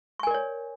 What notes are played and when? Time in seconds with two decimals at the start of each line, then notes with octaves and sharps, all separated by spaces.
0.20 C#6
0.23 G#5
0.27 A#4
0.31 D5
0.34 C#5